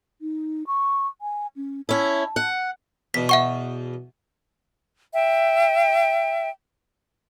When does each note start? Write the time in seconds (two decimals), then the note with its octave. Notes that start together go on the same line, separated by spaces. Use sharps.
0.22 D#4
0.67 C#6
1.21 G#5
1.56 C#4
1.89 C#4 E4 A5
2.36 F#5
3.14 E2 B2 B6
3.29 E5 F#5 C#6
5.14 E5 G5